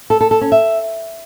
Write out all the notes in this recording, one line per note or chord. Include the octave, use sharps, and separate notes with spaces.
A4
A4
A4
C#4
E5